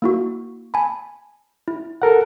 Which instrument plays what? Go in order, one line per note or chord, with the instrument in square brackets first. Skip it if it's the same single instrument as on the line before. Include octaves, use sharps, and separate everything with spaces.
[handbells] A#3 E4 F#4
G#5 A5 B5
E4
[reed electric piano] A4 A#4 F#5